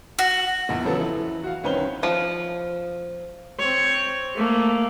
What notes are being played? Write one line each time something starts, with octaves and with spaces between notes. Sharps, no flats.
F#4
A#1 E2
C#3 F3 F#3 B3 A4
E3
F#4 F5
C2 D#3 C#4 B4 C5 G7
F3
C4 C#5
A3 A#3